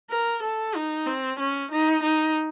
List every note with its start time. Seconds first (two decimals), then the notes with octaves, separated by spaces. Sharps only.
0.10 A#4
0.43 A4
0.75 D#4
1.07 C4
1.39 C#4
1.72 D#4
2.03 D#4